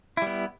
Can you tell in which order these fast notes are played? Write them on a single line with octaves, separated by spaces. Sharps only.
E4 G3 B3